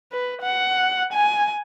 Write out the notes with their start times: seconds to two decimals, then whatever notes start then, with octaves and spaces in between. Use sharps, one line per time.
0.12 B4
0.42 F#5
1.13 G#5